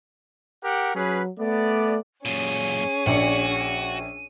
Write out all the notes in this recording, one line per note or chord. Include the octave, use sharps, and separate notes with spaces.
G4 A#4 F#5
F#3 C#4 G#4 B4
A3 B3 D5
F#2 A#2 C#4 G#4 D#7
A#1 F#4 D5 C#7